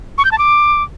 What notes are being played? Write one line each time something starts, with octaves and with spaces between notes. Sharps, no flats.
C#6
G6
A5
D6